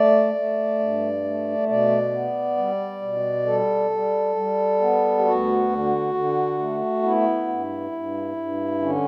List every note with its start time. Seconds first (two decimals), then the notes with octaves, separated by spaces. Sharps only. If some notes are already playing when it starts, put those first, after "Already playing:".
Already playing: A3 D5
0.35 A3
0.79 G2
1.24 A3
1.68 B2 D5
2.13 B3
2.57 G3
3.02 B2
3.46 G3 A4
3.91 G3
4.36 G3
4.81 B3
5.18 G4
5.25 D2 F#4
5.69 D3
6.14 D3
6.58 A3
7.03 B3 E4
7.47 G2
7.91 G2
8.36 G2
8.81 D3 C#4